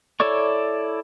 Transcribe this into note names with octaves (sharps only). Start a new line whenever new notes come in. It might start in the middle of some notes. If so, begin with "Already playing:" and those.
E4 A4 C#5 D5 C#6